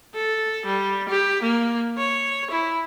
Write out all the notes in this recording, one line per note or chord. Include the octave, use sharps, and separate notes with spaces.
A4
G3
G4
A#3
C#5
E4